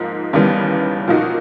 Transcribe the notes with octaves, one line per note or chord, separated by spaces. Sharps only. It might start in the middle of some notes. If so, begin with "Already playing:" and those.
Already playing: G#2 F3 A#3 D#4
D#2 C#3 E3 G3 B3
A#2 F3 A#3 D#4 F#4